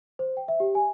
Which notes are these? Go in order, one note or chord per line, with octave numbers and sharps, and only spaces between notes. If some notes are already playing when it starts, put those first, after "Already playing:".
C5
G5
E5
G4
G#5